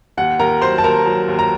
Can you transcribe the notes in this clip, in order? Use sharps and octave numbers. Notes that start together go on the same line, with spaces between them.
D#2 F#5
D#2 A#4 A#5
F#3 C5 C6
A5
D#2 A#4 A#5
F#3
D#2
A#5